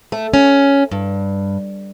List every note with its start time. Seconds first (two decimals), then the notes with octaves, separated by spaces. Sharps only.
0.12 A3
0.34 C#4
0.91 G2